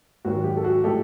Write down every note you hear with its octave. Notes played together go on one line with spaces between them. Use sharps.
G#2 D#3 F#3 F#4
G4
A4
F#4 G#4
A2 F3 G#3 G4 A4